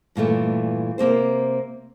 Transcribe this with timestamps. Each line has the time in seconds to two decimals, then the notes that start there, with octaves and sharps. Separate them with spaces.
0.15 G2 A#2 E3 A3
0.98 C3 A#3 C4 C5